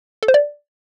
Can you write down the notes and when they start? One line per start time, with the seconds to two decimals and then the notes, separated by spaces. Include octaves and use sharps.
0.23 A4
0.28 C5
0.34 D5